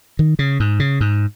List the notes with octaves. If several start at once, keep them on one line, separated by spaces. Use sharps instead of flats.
D#3
C#3
G#2
C#3
G#2